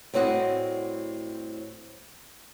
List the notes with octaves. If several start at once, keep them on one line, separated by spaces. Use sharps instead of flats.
A2 G3 C4 F#4 D#5